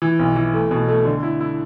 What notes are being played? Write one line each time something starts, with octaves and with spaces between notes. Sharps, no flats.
E3
B1
E3
A3
B2
A3
D3
E4
E4